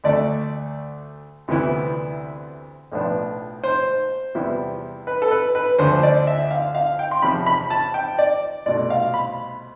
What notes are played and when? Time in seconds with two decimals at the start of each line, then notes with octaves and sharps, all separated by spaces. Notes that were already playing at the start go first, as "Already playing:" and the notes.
0.04 D2 D3 A3 D5
1.48 D2 C3 E3 B3 E4
2.92 B1 A2 F3 B3 D4
3.64 C5
4.35 E2 C3 G3 B3 E4
5.07 B4
5.22 A4
5.31 B4
5.55 B4
5.78 D2 D3 F3 C5
6.03 D5
6.27 E5
6.51 F5
6.75 F5
6.99 G5
7.11 C6
7.22 E2 C3 F3 B5
7.46 B5
7.70 A5
7.94 G5
8.18 D5
8.66 C2 B2 A3 D5
8.90 F5
9.14 B5